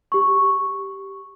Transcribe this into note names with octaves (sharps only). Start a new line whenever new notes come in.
G4 C#6